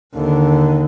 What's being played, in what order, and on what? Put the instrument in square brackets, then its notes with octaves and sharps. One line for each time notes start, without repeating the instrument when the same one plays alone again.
[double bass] D#2 D3